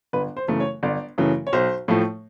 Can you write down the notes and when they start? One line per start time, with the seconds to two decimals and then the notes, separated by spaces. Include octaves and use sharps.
0.13 G1 B4
0.37 C5
0.48 F#2 C#3 E3 A3
0.60 C#5
0.83 G1 D5
1.18 F#2 C#3 E3 A3
1.47 C#5
1.53 B1 C5
1.88 A2 F3 A3